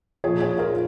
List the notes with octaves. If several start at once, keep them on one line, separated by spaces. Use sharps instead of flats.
A#2 F3 G#4 C#5
G#4 C#5
F4 A#4